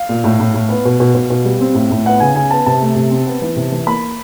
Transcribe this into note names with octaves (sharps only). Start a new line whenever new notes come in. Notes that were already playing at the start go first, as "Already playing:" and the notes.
Already playing: F5
A#2
A2
A2
A2
B3
B2
B2
B2
B2
G3
C4
A2
A2
B3 F#5
C#3 G#5
C#3 G#5
B3 A5
C3 A5
A3
C3
C4
B3
E3
C3
E3
A#3 B5